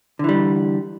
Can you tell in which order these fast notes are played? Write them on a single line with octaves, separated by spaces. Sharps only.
D3 E3 G3